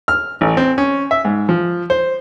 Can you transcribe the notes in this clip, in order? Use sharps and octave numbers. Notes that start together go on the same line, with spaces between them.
F6
A1
C4
C#4
E5
G#2
F3
C5